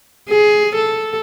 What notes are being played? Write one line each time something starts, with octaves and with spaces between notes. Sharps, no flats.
G#4
A4